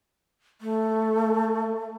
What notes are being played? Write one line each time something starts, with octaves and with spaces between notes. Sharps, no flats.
A3